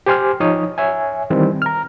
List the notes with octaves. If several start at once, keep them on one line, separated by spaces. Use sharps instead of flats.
G4 C5 G#5 C6 D6 F6
F3 D#4 C#5 D#6
C#5 E5 G#5
D#3 E3 G3 C4
A#5 F6